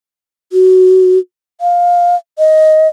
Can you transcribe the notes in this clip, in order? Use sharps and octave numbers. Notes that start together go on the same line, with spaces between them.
F#4
F5
D#5